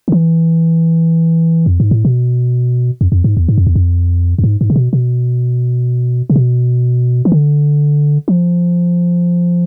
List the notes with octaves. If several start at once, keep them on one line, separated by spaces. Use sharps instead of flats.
D3
E3
F2
G#2
A2
B2
F2
F2
G#2
E2
G#2
F2
E2
F2
F2
G#2
G#2
C3
B2
B2
C3
B2
E3
D3
F3